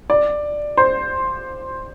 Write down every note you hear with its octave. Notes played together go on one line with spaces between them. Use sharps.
D5
C5